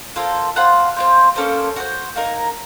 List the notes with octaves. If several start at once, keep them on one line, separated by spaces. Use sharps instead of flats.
A#3 F4 A4 C5
F4 C5 F#5 A5
C4 F4 C5
A#3 C#4 A4 C5
F#4 A4 C5
A#3 D#4 A#4